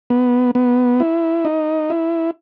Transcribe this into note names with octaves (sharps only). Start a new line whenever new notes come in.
B3
B3
E4
D#4
E4